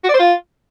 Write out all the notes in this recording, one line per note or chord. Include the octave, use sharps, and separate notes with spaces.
F#4
D5
C5
F4